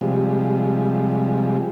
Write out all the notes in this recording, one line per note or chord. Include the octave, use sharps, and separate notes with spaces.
C3 F3 G3 G#3